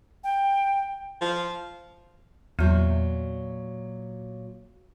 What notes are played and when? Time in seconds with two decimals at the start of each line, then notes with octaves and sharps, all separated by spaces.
0.24 G5
1.21 F3
2.59 E2 A#2 F#3